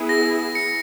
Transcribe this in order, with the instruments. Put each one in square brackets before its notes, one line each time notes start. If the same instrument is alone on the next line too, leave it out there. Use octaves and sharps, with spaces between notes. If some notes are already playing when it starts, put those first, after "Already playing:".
Already playing: [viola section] B3 E4 G#4
[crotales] A#6
C#7